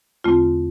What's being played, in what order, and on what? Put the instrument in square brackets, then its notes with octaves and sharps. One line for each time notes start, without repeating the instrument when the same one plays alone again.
[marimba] E2 D3 A3 C4 F4